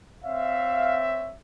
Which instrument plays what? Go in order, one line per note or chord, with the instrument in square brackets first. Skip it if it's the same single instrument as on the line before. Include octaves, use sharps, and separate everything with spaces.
[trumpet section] C4 C#5 E5 [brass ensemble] F5